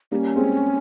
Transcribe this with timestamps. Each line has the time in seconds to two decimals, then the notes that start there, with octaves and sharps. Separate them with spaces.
0.12 G3 A#3 C#4 D#4
0.36 G#3 C4